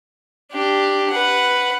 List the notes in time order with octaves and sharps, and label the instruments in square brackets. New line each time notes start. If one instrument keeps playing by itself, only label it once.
[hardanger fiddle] D4 G4
B4 F#5